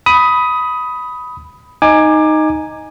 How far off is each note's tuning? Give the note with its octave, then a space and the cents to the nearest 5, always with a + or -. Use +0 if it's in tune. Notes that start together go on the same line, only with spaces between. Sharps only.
B5 +0 D#6 +15
D#4 +0 G#5 +0 D6 +20